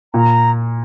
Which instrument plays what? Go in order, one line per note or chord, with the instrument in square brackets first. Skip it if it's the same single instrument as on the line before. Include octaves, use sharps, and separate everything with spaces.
[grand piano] A#2 [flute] A#5